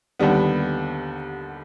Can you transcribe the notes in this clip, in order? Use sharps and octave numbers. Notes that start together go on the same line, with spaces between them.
D#2 D3 G3 B3